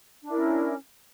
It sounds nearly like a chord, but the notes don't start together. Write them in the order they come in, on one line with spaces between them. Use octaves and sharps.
D4 E4 A#4 C#4